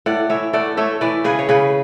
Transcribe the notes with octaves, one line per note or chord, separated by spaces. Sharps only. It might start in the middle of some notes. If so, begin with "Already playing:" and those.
A2 D5 F#5
E3 C#5 E5
A3 D5 F#5
A3 C#5 E5
E3 B4 D5
C#3 G#4 B4
C#5
C#3 G#4 B4